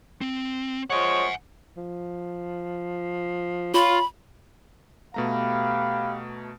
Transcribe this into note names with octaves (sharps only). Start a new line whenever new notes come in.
C4
F3 G#3 C#5 F#5 G#5
F3
F4 C#5 B5
B2 A3 G4 B4 F5 A#5